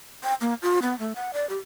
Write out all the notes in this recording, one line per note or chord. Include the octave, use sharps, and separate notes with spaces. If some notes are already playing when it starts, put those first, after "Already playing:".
G5
A#3
F4
B3
A3
F#5
D5
G4